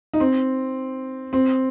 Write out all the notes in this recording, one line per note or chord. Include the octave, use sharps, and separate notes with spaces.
D#4
C4
C4